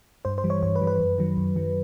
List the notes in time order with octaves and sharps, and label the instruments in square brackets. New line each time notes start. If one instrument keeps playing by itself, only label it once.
[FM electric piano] G2 C5
C5
E3 G3
C#5
G2 C#5
B4
E3 G3
B4
F#2
D#3 F#3
F#2
D#3 F#3